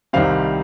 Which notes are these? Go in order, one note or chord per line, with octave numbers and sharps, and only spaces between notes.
C2 C3 D#3 G3 C4 F5